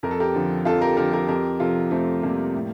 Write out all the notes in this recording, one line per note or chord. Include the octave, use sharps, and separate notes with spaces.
F2 A#4
A4
G4 A#4
D3 F3
F2 F4 A4
G4 A#4
D3 F3 G4 A#4
G4 A#4
F2 G4 A#4
C3 F3 F4 A4
F2 A3 C4
C3 F3 G3 A#3
A2